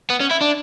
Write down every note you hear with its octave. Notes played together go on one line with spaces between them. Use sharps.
B3
C#4
E4
D4